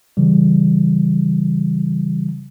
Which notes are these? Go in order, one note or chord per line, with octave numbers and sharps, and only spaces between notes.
C#3 E3 G3